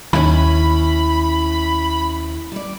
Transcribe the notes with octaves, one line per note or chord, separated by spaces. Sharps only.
D#2 C#4 E4 B5
G3 D5